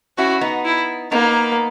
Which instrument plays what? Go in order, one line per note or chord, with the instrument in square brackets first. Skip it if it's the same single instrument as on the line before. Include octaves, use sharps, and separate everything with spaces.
[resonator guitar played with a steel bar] C#4 E4 [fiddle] F#4
[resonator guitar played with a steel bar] B3 D#4
[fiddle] E4
[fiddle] A#3 [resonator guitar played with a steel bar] B3 D#4